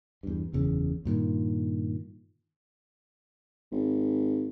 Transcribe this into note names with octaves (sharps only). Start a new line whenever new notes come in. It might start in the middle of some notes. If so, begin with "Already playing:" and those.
E2 G2
F#1 E2 C#3
G2 A#2 D#3
G#1